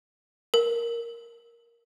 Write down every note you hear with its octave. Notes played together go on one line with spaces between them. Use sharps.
A#4